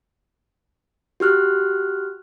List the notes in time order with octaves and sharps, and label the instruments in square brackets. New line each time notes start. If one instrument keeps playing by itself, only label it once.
[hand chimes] F#4 G4 F6 F#6